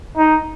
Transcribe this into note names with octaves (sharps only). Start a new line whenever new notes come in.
D#4